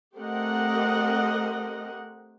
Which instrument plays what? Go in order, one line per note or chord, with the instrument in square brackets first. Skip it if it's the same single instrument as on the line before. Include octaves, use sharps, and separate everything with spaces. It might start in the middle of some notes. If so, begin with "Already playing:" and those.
[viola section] A3 C4 G4 A#4 D#5 F#5